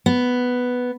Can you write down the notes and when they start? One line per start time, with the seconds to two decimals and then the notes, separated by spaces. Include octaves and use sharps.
0.06 B3